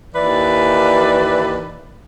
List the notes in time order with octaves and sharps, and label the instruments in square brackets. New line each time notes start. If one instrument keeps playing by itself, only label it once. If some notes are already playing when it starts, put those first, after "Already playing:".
[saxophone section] D#2 E3 B4 D5